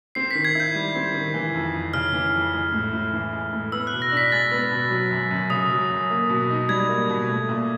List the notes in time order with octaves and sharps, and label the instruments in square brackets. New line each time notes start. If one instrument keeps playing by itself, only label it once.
[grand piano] C4 [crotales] C7
[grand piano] D#3 [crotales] B6
[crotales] G#6
[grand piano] E4 [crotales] G6
[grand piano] G3
C4
D#3
E3
F2
F2
[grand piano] C#3 [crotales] F6
[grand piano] E3
F2
G#3
A2
A2
E3
G#3
A2
[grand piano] B3 [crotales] E6
[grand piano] B2 [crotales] F#6
[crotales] A#6
[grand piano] D4
[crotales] B6
[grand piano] G#3 [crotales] A6
[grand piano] B3
B2
F#3
F#2
F#2
[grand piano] C#3 [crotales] D#6
[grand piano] F#3
F#2
A#3
B2
D#4
[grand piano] G3 [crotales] G#6
[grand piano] A#3
B2
A3
A#2